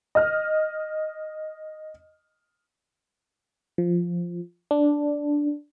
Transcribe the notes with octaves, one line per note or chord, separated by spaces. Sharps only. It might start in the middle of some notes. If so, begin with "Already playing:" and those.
D#5 F6
F3
D4